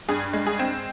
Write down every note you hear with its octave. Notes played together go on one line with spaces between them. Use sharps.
G2 G#4
G#3
G#4
C4